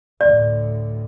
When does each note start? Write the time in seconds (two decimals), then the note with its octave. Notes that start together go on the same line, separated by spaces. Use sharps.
0.21 D2 A2 D5